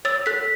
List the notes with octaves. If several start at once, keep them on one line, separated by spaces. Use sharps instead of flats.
C#5 E6 A6
A4 F#6 B6